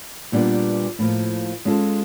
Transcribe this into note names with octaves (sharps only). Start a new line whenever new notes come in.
A#2 G3 B3 D4
A2 F3 A#3
G#3 C#4 F4 A4